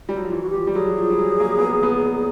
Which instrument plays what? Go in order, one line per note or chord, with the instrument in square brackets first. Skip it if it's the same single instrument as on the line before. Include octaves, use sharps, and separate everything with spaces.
[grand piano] G3
F#3
F3
[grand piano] E3 [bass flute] G4
[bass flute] F#4
[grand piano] F3 [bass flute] G4
[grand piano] G3
[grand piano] F#3 [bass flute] G#4
[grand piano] F3
G3
F#3
A#3
B3
A#3
B3